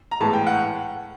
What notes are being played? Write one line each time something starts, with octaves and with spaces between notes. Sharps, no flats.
A#5
A2 E3 G#3 B3 A5
G5
F#5